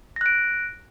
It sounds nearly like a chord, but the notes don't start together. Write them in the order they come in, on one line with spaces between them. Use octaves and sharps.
A#6 F#6 D7